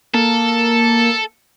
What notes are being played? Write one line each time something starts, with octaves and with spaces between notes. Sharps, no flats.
A#3 A4